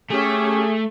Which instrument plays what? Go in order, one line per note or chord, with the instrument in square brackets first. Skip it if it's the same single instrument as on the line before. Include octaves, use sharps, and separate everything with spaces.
[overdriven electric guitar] A3 [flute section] C#4 G4 [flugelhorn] G#4